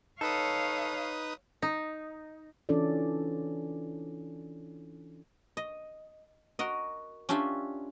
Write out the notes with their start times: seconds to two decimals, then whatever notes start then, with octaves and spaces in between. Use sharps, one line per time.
0.21 D#4 A4 B4 C#5 F5 D#6
1.62 D#4
2.69 E3 C#4 D4 F4 A4 D5
5.57 D#5
6.59 F#4 A#4 D#5
7.29 C#4 D4 F4 G4 E5